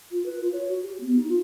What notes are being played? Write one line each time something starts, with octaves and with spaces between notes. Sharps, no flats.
F4
B4
F4
C#5
F#4
G4
B3
D#4
F4